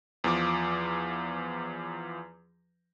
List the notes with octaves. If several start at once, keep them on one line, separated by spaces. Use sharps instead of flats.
E2 F3 D6